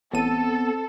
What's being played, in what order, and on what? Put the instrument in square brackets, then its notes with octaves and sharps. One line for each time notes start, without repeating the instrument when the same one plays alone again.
[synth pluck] A1 D#7 [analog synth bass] B3 [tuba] C4 [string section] A4